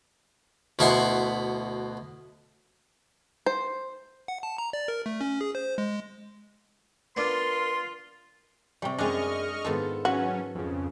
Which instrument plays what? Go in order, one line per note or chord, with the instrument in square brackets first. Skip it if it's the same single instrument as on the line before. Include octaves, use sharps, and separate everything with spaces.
[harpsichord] D2 B2 E4 E5 F#5 C6
[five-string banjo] C5
[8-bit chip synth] F#5
A5
A#5
D5
A#4
A3
C#4
G#4
C5
G#3
[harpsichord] B3 D4 [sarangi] F4 [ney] A#4 [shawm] C6
[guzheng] C3 G3 [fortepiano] D5 G5 C#6
[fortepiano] F#2 [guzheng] G#3 D4 [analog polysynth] D#5 C#6 F6
[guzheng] G#2 D#3 F4 [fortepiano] B3 A4
[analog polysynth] F#3 C#4 [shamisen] F#4 [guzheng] B4
[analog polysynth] F2 C#3